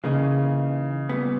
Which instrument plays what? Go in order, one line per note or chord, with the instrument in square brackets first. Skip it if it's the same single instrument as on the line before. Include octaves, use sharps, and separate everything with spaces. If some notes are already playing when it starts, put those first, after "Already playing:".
[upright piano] C#3 [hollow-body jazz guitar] E3 A#3 D#4 G#4
[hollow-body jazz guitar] A#2 G3 B3